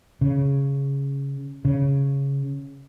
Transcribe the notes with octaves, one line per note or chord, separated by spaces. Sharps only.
C#3
C#3